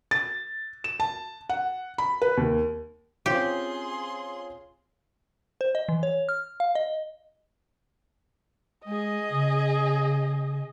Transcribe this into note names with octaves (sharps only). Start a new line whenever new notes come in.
A6
E7
A5
F#5
B5
B4
D#2
C4 C#4 F4 G4 G#4 C6
C5
D#5
E3
C#5
F6
F5
D#5
G#3 G#4 D#5
C#3